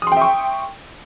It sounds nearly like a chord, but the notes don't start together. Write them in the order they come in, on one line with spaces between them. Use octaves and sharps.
D#6 C6 G5 E5 C#6